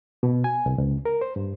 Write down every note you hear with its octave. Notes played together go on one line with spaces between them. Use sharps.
B2
G#5
C2
C#2
A#4
C5
G2